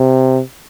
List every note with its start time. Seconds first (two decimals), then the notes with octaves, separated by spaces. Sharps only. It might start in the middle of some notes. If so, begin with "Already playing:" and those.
Already playing: C3